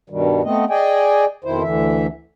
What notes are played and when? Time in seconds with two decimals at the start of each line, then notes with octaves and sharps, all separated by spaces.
0.10 G2 B2 D#3 G3
0.44 A3 B3 C4 D#5
0.70 G#4 D5 D#5 G5 G#5
1.44 F2 B2 D#3 E4 C5
1.63 D2 D3 E3 E5